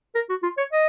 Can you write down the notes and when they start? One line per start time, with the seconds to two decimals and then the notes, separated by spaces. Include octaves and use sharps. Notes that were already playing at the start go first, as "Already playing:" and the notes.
0.15 A#4
0.30 F#4
0.43 F4
0.58 C#5
0.73 D#5